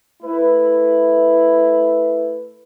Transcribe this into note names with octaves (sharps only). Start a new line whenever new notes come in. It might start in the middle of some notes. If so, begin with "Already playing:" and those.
A3 E4 B4